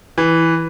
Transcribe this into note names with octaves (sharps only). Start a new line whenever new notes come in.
E3